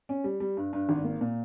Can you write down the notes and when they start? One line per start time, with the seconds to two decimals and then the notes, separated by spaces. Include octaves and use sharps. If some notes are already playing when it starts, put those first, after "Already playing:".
0.09 C#4
0.24 G3
0.40 G3
0.57 G2
0.73 G2
0.89 G#1
1.04 A#3
1.21 A#2